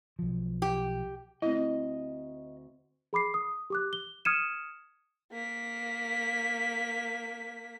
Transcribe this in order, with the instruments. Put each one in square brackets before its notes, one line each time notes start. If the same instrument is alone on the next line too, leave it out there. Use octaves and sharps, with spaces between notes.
[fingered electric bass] B1 F3
[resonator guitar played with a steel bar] G4
[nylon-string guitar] D2 C4 [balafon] E4 [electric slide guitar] D#5
[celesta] G#4 B5 D6 C7
D#6
G4 D6 F#6
G7
D#6 F6 G#6 C#7 D#7 E7
[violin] A#3 B6